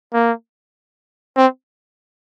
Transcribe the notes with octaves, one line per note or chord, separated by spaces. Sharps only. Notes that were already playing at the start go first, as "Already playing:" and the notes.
A#3
C4